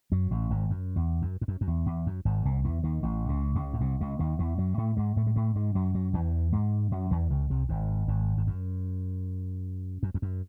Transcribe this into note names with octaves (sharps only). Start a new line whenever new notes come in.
F#2 F#3
A1 A2
G#1 G#2
F#2
E2
F#2
G#2
F#2
F#2
E2
E2
F#2
G#1 G#2
C2 C3
E2 E3
D#2 D#3
A1 A2
C#2 C#3
C#2 C#3
A2
C2 C3
C#2 C#3
D#2 D#3
E2 E3
F#2 F#3
A2 A3
G#2 G#3
A2 A3
G#3
A2 A3
G#2 G#3
F#2 F#3
F#2 F#3
E2 E3
G#2 G#3
F#2 F#3
E2 E3
C#2 C#3
C2 C3
G#1 G#2
G#1 G#2
G#2
F#2
F#2
E2
F#2